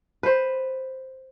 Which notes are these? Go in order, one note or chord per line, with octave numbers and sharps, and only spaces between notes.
B4 C5